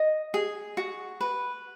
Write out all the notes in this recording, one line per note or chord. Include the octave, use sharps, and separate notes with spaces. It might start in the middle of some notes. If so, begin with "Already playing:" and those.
Already playing: D#5
G#4
F#4
B4